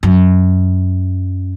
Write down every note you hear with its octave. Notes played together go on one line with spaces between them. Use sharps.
F#2